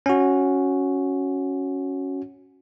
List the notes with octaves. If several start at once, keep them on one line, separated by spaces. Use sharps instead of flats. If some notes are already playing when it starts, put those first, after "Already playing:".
C#4 F#4